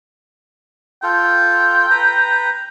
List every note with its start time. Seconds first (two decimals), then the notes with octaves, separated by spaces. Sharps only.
1.03 F4 A4 G5
1.90 B4 A#5